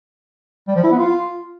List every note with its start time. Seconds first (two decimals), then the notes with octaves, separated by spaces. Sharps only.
0.68 G3
0.76 F3
0.83 E4
0.91 B3
0.99 F4